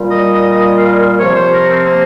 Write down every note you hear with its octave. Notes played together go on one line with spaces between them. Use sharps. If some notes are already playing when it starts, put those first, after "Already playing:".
Already playing: A#2 G3
D#5
D#5
D#5
F5
C3 F3 C#5
C5
A#4
C4
A#3